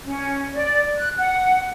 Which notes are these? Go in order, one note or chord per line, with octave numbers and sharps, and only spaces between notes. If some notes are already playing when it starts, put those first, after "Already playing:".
C#4
D5
F#6
F#5